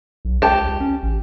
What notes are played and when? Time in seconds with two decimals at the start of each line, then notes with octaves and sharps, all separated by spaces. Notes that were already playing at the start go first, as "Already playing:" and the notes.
0.25 B1
0.42 C#2 G4 A5
0.68 C#2
0.81 C#4
1.03 A1